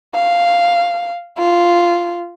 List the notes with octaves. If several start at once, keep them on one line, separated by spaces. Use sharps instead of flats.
F5
F4